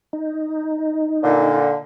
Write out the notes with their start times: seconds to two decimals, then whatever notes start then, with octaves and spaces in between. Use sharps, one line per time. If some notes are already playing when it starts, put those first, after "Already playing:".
0.13 D#4
1.23 A#2 D3